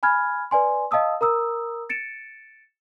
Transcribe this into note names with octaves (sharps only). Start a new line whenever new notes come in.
G#5 B5 F6 G#6
B4 D5 G#5 C6
D#5 F5 A5 D#6 E6
A#4 A#5 D#6 E6
A6 C#7 D7 E7